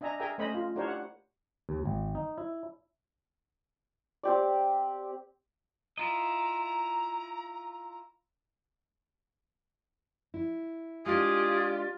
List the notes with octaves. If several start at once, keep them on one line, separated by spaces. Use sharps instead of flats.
D4 D#5 E5 G#5 A#5
G#4 A#4 E5 G5 G#5 A#5
A3 C#4 C5 D#5 B5
F4
D4 E4 G4 A#4 C5 C#5
F#5
D#2
G#1
D#4
E4
C4 G4 D5
E4 F4 D#5 A#5
E4
G#3 D4 F4 G4 G#4